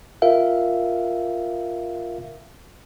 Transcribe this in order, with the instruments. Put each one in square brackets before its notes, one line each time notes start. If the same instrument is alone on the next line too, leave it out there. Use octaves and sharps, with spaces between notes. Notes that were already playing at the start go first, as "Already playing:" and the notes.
[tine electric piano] F4 A#4 E5 F5